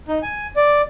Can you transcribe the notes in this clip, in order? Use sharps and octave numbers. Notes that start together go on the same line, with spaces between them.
D#4
G#5
D5